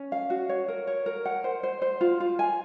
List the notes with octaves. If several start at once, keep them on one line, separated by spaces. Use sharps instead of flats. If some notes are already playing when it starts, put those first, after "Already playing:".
Already playing: C#4
F5
F#4
C#5
A#4
C#5
A#4
F#5
C5
C5
C5
F4
F4
G#5